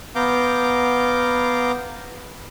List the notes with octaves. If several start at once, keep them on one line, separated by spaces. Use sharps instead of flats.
B3 F5 A#5 D6 G6